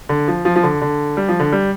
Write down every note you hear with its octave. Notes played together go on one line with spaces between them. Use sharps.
D3
F3
F3
F3
D3
D3
G3
F3
D3
G3